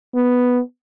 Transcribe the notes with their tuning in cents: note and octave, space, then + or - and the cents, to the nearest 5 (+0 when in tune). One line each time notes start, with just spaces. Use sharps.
B3 +0